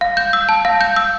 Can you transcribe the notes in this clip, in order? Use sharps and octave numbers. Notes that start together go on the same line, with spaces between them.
F5
G6
E6
A5
F5
G6
E6